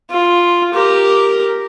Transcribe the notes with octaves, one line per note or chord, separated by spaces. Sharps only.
F4
G4 A#4